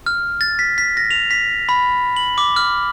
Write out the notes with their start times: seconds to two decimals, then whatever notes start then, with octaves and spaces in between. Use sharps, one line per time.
0.06 F6
0.41 A6
0.59 B6
0.78 B6
0.97 A#6
1.11 F7
1.31 B6
1.69 B5
2.16 F#7
2.38 D6
2.56 F6